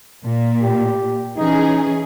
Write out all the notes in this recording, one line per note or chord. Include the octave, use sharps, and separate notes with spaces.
A#2
G4
E3 C#4 D#4 G#4